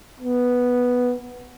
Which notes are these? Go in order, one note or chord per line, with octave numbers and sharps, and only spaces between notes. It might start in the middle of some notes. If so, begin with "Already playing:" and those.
B3